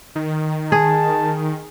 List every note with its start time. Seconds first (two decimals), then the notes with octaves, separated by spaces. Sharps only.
0.15 D#3
0.72 G#4 A5